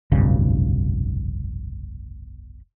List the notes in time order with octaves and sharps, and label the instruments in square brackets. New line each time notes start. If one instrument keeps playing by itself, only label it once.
[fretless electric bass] F1 B1 G2 C#3